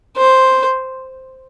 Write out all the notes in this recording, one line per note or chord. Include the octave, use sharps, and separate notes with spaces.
C5